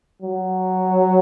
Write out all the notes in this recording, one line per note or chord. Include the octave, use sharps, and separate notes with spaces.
F#3